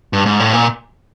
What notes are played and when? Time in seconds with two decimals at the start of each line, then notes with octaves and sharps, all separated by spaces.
0.13 G2
0.26 G#2
0.40 A2
0.53 A#2